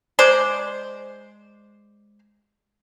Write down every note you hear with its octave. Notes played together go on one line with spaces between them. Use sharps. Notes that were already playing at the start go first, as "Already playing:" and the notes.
G#3 C5 D5